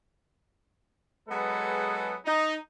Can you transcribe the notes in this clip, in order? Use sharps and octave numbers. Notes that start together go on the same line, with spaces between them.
F#3 G#3 B3 G#4 A4 B4
D#4